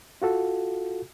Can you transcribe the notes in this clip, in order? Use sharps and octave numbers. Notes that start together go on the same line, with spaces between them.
F4 F#4 A4